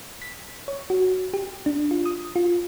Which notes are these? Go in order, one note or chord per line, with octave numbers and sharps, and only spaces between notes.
B6
C#5
F#4
G4
D4
F4
D#6
F4